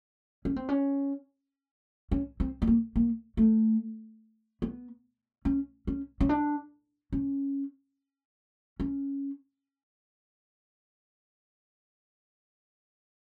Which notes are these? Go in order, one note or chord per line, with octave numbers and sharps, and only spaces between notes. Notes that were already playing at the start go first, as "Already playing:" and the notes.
C#4
C4
C#4
C#4
C4
B3
A#3
A#3
A3
B3
C#4
C#4
C#4
D4
C#4
C#4